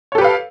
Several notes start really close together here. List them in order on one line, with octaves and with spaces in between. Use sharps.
C#5 A4 G4 B4 F5